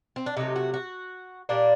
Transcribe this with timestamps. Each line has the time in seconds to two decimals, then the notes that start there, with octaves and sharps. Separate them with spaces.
0.16 C4
0.26 D4
0.36 C3 F#3 A3 D#4
0.56 F#4
0.74 F#4
1.49 A#2 G3 A#3 D4